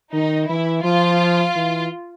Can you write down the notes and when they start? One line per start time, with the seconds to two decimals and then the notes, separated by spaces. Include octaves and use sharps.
0.12 D#3 D#4
0.49 E3 E4
0.84 F3 F4
1.56 E3